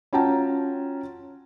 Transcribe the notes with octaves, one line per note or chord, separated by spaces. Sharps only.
C#4 F4 F#4 G5 A5 A#5